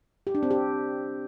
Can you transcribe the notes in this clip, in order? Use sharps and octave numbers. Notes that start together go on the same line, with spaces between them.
G4
D4
C4
G4